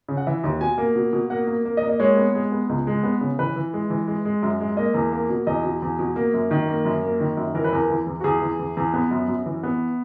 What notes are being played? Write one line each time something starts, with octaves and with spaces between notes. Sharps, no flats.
C#3
F#5
E3 E5
D#2
B2 G#5
A#3
B2
B2
A#3 F#5
A#3
A#3
D#5
A#3
D#5
G#3 C#5
B3
G#3
B3
C#2
G#3
B3
C#3
E3 B4
E3
G#3
E3
G#3
G#3
F#2
G#3
A#3 D#5
E2
A#3
B2
E2 D#5
B2
E2
B2
A#3
F#2
D#3
A#3
F#2
A#3
D#3
F#2
E3 A#4
B4
E2 A#4
E3
E2
F#4
E2 G#4
E3
E2
E2
B3
F#2
F#2
E3
B3